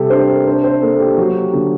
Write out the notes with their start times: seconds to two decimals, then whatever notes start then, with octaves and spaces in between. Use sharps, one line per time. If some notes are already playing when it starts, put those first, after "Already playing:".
Already playing: C3 G3 G4 A4
0.10 D4 C5
0.29 A#4
0.47 D4 C5
0.64 C5
0.81 A#3 A4
0.95 A4
1.00 G4
1.17 F#3 F#4
1.35 G4
1.53 D3 F#4